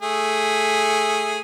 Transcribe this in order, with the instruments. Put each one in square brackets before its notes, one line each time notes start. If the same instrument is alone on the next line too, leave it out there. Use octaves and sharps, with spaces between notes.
[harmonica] A3 G#4